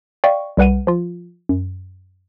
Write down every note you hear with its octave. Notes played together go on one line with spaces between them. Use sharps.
D5 D#5 F5 G5 C#6
C2 G3 B4 F#5 D#7
F3 F4
F#2